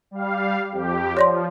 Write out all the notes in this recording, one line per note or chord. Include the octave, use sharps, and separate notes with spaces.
G3 F5
F2 G4
F3 C#5 D5 C6